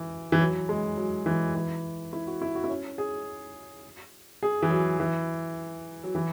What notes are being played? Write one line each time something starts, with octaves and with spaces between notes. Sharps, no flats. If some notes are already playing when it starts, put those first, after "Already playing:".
Already playing: E3
E3
F#3
G#3
F#3
E3
E3
E4
F#4
E4
F#4
E4
C#4
G#4
G#4
E3
F#3
E3
F#3
E3